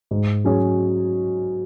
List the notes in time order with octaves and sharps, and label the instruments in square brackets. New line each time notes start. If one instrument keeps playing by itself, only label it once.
[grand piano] G#2
F#3 C#4 G#4 C#5